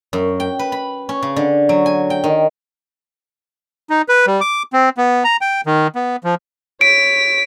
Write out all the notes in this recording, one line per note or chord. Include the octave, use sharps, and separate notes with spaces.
F#2
G5
B4
B5
C#4
C#3
D3
F#3
G#5
G5
D#3
D#4
B4
G3
D6
C4
B3
A#5
G5
D#3
B3
F3
C#5 B6 D7